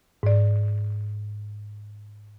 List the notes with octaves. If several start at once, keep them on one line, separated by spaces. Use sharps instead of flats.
G#2 D5